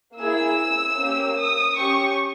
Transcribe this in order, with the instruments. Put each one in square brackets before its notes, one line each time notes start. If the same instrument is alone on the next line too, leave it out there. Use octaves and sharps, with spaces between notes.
[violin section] A#3 E4 G#4 E6
A#3 C#4 G4
D#6
C#4 G4 C#6